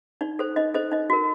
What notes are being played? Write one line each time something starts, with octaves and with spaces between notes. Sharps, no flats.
D#4 D5
A4 C5
D#4 D#5
A4 C5 D#5
D#4 D#5
F#4 A#4